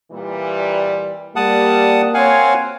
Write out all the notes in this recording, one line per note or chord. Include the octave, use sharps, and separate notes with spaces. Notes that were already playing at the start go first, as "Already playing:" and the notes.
A#2 E3 G3
G3 A#3 F#5 A5 D#6
C4 C#5 F5 F#5 G#5